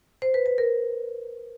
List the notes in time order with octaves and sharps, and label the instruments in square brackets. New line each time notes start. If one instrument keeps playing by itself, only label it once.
[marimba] C5
B4
B4
A#4